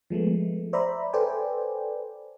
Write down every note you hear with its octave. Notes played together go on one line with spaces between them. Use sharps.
F3 G#3 A3 B3
C5 D5 E5 A#5 B5
A4 B4 C5 D5 G5 G#5